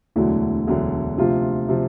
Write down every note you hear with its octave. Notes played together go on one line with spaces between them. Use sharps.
E1 D2 D3 F#3 A3 E4
E1 D2 D3 F#3 A3
D2 C3 F3 F4
C3 F3